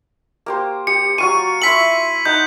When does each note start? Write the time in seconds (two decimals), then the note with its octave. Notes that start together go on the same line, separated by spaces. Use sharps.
0.46 A#3 G4 C5
0.87 G4 C#7
1.18 F#3 F4 C#6 D#7
1.62 E4 C6 E6 B6 F#7
2.25 D#4 F#5 G6